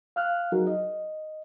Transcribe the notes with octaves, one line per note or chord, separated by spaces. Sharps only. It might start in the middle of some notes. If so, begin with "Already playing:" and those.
F5 F6 F#6
F#3 D#4 F#4 G#4 A#4
D#5